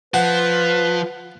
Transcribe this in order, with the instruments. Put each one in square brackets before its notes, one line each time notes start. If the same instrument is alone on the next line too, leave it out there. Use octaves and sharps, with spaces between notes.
[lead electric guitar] F3 [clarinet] B4 [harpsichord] F#5